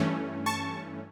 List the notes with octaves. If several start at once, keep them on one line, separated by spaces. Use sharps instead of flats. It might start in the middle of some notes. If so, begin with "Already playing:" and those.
Already playing: G2 E3 A3 C#4
A5 C#6